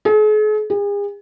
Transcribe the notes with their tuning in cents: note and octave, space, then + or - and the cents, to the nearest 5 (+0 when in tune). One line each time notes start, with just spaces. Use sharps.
G#4 +45
G#4 -40